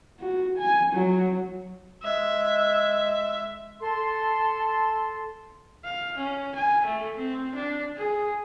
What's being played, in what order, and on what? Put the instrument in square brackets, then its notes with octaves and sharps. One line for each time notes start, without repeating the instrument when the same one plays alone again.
[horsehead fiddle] F#4
G#5
F#3
[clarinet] G#3 [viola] E5
[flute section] A4 C6
[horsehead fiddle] F5
C#4
G#5
A3
C4
D4
G#4